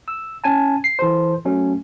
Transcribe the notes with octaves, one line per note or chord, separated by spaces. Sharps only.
E6
C#4 G#5 A5
C7
E3 A4 C5
F#3 A3 C#4